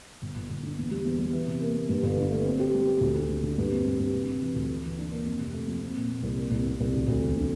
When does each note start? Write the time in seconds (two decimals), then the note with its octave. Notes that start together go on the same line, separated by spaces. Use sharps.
0.22 G1
0.36 G1
0.50 G1
0.63 D3
0.78 E2
0.91 G3
1.05 E2
1.19 G3
1.33 E3
1.47 C3
1.61 A#3
1.76 A#3
1.89 G2
2.03 G1
2.17 D3
2.31 A3
2.45 C4
2.60 G4
2.74 G3
2.87 G4
3.01 D2
3.15 D3
3.29 D3
3.44 D3
3.58 G2
3.72 C4
3.85 G2
3.99 G2
4.14 C3
4.27 C3
4.42 E3
4.55 D2
4.70 E3
4.84 E3
4.98 D4
5.11 A#3
5.26 F2
5.39 C3
5.54 A3
5.68 F3
5.82 C4
5.95 A#2
6.09 A#2
6.23 C2
6.38 A#3
6.51 C2
6.66 C2
6.80 C2
6.94 D2
7.08 D2
7.22 E1
7.36 D3